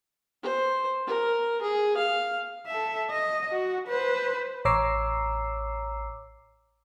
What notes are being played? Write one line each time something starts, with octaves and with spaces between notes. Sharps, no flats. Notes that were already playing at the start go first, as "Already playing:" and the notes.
C5
A#4
G#4
F5
A4 E5
D#5
F#4
B4 C5
A1 C#5 A#5 D6 E6 C7